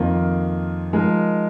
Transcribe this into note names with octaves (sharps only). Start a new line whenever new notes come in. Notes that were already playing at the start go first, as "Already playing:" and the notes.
Already playing: F2 D#3 A#3 F4
F3 G#3 D#4 A#4